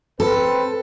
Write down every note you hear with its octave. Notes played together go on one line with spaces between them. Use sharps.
C4 A4 B4